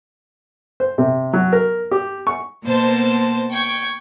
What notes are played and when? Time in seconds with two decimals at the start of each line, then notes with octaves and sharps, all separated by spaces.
0.80 C5
0.98 C3
1.33 F#3
1.52 A#4
1.91 G4
2.27 C#6
2.64 B2 A#3 C5 A5
3.50 G5 C#6 G#6